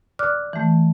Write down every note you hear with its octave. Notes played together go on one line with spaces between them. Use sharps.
D5 D6 F6 F#6
E3 A3